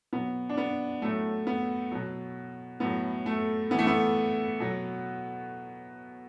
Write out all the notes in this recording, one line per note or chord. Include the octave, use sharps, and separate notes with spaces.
B2 F#3 B3
D4
B3
A2 F#3 A3
B3
B2 F#3
A2 F#3 B3
A3
A2 E3 B3
A3
B3
B2 F#3